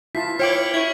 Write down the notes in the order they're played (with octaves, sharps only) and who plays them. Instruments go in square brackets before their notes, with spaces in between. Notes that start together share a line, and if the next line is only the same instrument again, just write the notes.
[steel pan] E4 F4 A5 [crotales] B6 C7
[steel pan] E4 G5 D6 [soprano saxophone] C#5 [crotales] F6 D7 F#7
[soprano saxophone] E4 [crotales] C#6 G#6